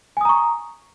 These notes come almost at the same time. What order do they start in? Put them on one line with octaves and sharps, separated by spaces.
G#5 D#6 A#5 C#6